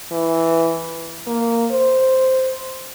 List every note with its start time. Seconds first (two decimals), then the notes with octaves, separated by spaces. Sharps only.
0.12 E3
1.27 A#3
1.71 C5